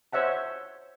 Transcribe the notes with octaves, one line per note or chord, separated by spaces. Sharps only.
C5 C#5 E5 F#5 A5